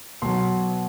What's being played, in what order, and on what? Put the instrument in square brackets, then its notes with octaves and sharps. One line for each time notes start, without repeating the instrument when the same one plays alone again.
[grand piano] B2 F#3 C6